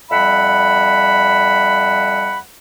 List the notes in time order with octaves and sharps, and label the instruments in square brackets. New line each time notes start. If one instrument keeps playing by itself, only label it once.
[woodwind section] F2 G3 E5 F#5 B5